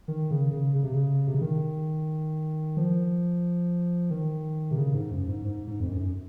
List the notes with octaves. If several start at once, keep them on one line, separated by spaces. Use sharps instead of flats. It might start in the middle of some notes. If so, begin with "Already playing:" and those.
D#3
C#3
C#3
C#3
C3
C#3
C3
C#3
D#3
F3
D#3
C3
C#3
G#2
F#2
G#2
G#2
G#2
F2
F#2
F#2